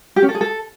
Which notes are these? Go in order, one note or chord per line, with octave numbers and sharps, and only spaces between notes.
G4
C#4
A4
G#4
A4